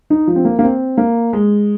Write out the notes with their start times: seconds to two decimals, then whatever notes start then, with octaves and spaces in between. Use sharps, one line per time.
0.10 D#4
0.27 F3
0.36 C4
0.45 A#3
0.59 A#3
0.63 C4
0.98 A#3
1.33 G#3